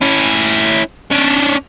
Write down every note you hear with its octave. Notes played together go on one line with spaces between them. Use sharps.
C#4 E4
C#4 D4